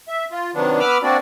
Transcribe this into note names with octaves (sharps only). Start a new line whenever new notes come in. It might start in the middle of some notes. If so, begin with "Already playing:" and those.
E5
F4
C3 D#3 F#3 B3 D4
B3 B4 B5 D6 E6 F6
A#3 C4 D4 F#4 D5